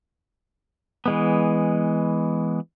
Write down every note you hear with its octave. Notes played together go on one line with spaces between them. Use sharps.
E3 G#3 B3